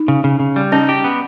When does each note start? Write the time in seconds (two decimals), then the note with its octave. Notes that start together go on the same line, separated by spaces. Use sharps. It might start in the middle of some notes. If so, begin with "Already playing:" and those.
Already playing: D#4
0.08 C#3
0.24 C#3
0.40 C#3
0.56 G3
0.72 C#4 D#4
0.89 G4
1.04 B3